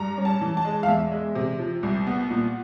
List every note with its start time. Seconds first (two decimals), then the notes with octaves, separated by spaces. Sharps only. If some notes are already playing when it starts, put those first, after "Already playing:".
Already playing: G2 A#5
0.18 C#4
0.25 A5
0.41 E3
0.57 A5
0.64 G#3
0.83 F5
0.88 E2 E5
1.12 G#3
1.35 C3
1.59 F3
1.83 C2
2.07 B3
2.30 A#2